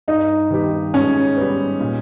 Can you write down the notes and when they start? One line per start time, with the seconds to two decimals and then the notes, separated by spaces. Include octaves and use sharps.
0.08 G2 D#4
0.51 D#3 G3 B3 G4
0.94 G#2 C#4
1.37 G3 B3
1.80 A#2